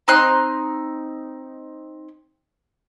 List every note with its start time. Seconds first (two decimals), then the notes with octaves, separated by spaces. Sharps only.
0.08 C4 D#4 C6 F#6